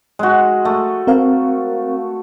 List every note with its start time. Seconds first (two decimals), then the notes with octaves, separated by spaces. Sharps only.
0.19 G#3 F#4
0.65 A3
1.07 C4 A#4 F5